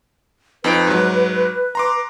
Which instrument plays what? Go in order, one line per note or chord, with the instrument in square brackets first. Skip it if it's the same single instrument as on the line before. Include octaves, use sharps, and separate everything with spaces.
[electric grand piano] F2 D#4 D7 [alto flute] B4
[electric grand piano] G#2 F#3
A#5 C6 D6